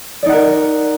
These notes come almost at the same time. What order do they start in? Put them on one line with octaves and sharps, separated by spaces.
D5 D#4 F#5 A#4